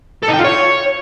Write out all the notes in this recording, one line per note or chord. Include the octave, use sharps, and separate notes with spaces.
A4
D#4
G5
F4
C#5